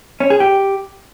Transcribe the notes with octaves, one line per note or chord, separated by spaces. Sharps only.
C#4
G#4
G4